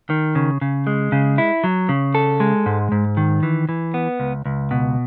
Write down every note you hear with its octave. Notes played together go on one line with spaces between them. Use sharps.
D#3
C#3
C#3
G#3
C#3
E4
F#3
C#3
A4
G#3
G#2
G#2
D#3
E3
E3
B3
C#2
C#2
B2